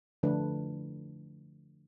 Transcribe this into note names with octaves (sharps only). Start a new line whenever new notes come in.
D3 F3 A3 D4 B4